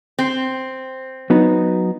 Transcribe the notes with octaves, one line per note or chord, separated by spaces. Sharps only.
C4
F#3 B3 D#4